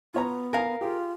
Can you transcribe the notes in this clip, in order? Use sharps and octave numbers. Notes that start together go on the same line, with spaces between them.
B3 F4 C#5 A#5
A#4 F5 G#5 A#5
F4 G4 G#4